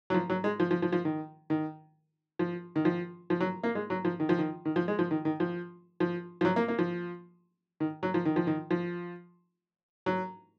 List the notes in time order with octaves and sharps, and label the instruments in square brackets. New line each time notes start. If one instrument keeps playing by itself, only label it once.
[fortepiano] F#3
F3
F#3
G#3
F3
F3
F3
F3
D#3
D#3
F3
D#3
F3
F3
F#3
A#3
G#3
F#3
F3
D#3
F3
D#3
D#3
F3
G#3
F3
D#3
D#3
F3
F3
F3
F#3
A#3
A#3
F3
D#3
F#3
F3
D#3
F3
D#3
F3
F#3